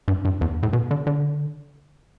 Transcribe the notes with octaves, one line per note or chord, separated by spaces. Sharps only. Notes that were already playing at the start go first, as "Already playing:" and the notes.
G2
G2
E2
A2
B2
D3
D3